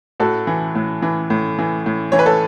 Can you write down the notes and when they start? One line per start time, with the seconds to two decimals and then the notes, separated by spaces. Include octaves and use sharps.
0.20 A2 F#4 A4
0.47 E3
0.75 A2
1.02 E3
1.30 A2
1.59 E3
1.86 A2
2.12 E3 C#5
2.19 B4
2.26 A4